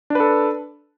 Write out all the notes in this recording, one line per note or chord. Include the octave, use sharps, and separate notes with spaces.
D4 A4 B4